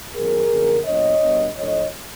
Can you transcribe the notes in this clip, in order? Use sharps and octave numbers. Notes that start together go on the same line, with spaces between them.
F#2 D#3 F#3 B3 G#4 A#4
F#2 D3 F3 A#3
A#2 F#3 B3 D4 C#5 D#5
B2 G3 B3 D4
A2 F3 A3 D4 C#5 D#5